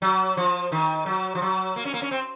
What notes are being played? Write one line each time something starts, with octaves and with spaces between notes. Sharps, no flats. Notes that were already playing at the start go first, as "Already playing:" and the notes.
F#3
F3
D#3
F#3
F3
F#3
A#3
C#4
A#3
C#4
C4